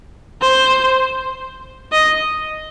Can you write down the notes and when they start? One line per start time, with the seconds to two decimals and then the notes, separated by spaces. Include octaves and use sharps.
0.42 C5
1.92 D#5